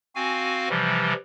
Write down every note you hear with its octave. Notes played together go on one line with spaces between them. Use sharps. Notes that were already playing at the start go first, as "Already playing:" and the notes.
C4 F#4 F5 G#5
C3 E3 F3 G3